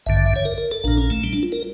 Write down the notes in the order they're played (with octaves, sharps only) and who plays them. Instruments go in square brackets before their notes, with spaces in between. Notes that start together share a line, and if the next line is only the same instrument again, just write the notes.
[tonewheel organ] A1 G2 D3 E5
E5
C#5
A#4
A#4
A4
A#1 A#2 D4
C#4
A3
G3
D4
F4
A#4